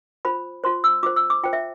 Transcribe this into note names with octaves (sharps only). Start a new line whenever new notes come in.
F4 C5 B5
F4 C5 C6
E6
F4 C5 D6
E6
D6
F4 C5 G5
E5